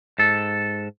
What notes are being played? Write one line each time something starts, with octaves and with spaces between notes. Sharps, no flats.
G#2 A4